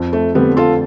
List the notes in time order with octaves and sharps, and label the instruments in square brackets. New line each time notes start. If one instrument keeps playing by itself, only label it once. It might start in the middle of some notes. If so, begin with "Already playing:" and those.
Already playing: [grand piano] F2
[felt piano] A3
[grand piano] D3 A3 C4 [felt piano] G3 B3
[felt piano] F4 A4